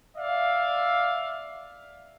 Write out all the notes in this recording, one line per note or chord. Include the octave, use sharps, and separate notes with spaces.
D5 E5 F5